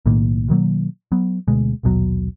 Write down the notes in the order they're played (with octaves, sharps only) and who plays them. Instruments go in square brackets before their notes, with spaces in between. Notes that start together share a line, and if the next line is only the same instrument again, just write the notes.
[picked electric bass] B1 A2 D#3 A#3
B2 D#3 F#3 A#3
F#3 B3
D2 B2 G#3
A#1 D#2 B2 F#3